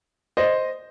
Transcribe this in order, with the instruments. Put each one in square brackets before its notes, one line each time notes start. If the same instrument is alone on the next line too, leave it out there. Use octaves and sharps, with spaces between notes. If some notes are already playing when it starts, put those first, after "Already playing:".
[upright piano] C5 D#5